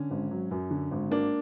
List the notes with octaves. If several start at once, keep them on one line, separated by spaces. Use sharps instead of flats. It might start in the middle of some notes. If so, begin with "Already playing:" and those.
Already playing: D3 C#4
G#1
F#3
F#2
D3
G#1
A#3 D4